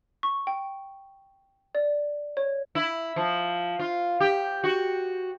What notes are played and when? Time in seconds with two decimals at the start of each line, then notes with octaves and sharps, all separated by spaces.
0.23 C#6
0.47 G5
1.75 D5
2.37 C#5
2.75 E4
3.16 F3
3.79 F4
4.20 G4
4.64 F#4